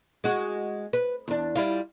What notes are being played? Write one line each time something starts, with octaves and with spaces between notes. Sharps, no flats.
G#3 F#4
B4
E2 D4
G3 E4 F4